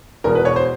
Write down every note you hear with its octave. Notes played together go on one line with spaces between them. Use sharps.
E1 E2 B2 A#4
B4
C#5
C5